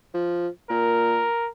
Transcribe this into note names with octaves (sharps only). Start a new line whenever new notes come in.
F3
A#2 A#4